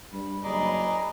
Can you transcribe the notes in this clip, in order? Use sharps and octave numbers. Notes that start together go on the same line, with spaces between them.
G2 B5
F#1 G#4 D5 D#5 A#5